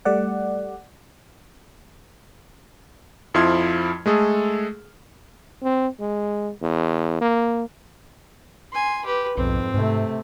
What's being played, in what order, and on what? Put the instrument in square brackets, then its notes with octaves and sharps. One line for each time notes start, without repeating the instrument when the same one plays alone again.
[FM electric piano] G3 A3 D5 F#5
[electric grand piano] F2 F3 E4 C6 F6 G#6
G#3 A3 G#4 A4
[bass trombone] C4
G#3
E2
A#3
[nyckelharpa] G#5 C6
G4 B4
[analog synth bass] B1 [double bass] F2 G#2 [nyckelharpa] C4
[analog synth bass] G#2 [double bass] C3 A3